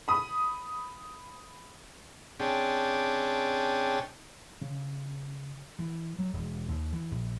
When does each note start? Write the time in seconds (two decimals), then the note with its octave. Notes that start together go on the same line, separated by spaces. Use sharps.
0.08 B5 D#6
2.40 C3 C#4 D4 G#4 G5 A5
4.62 C#3
5.79 E3
6.19 F#3
6.33 E1
6.68 D#2
6.93 E3
7.11 A#1